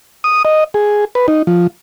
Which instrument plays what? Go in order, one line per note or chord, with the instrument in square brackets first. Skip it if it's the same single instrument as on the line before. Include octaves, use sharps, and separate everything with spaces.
[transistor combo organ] D#6
D#5
G#4
B4
D#4
F3